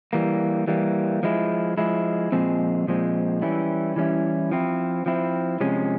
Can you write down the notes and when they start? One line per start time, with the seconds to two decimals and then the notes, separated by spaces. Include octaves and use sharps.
0.13 E3 G3 A#3
0.68 E3 G3 A#3
1.23 F3 G#3 E4
1.77 F3 G#3 E4
2.32 A#2 F3 G#3 C4
2.87 A#2 F3 G#3 C4
3.42 E3 G3 C#4 E4
3.96 E3 G3 C#4 E4
4.51 F3 C4 E4
5.06 F3 C4 E4
5.61 C3 F3 G#3 C#4